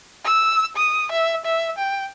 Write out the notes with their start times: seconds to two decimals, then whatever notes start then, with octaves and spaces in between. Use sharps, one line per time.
0.25 E6
0.77 D#6
1.12 E5
1.45 E5
1.78 G5